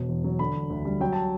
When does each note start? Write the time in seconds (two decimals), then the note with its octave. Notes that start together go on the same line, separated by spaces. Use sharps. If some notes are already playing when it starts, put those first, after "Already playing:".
Already playing: E1 B2
0.09 E2
0.24 F#3
0.39 D3 B5
0.55 E1
0.70 D2
0.85 G3
1.00 F#3 G5
1.13 A5